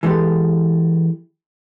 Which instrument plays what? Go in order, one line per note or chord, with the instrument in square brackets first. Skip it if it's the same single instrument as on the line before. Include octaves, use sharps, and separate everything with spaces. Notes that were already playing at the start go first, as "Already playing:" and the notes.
[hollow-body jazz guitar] E3 G#3 B3 G4 A4